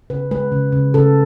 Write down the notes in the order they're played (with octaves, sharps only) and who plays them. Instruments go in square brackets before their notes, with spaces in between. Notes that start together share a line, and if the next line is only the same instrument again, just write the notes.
[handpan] C#3 B4
G#3 B4
C#3
C#3
C#3 A4